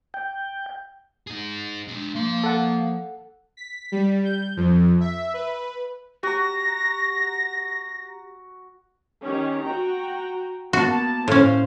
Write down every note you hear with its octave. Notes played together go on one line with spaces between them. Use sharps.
G5
D#4 G#4
G#3 D4
F3 A#3 C6
A4 F#5
B6
G3
G6
F2
E5
B4
F#4 G4 A#5 A#6
D#3 C#4 G4
F#4 G5 A#5
A#3 B3 F#4 A5
A2 C#4 C5 F5